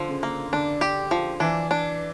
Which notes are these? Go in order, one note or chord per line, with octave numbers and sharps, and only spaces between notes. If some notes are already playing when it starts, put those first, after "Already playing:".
Already playing: D3 F3
C#3
A#3
D3 D4
G4
F3
E3 D4
D4